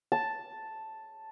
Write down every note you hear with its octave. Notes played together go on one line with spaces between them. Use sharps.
A5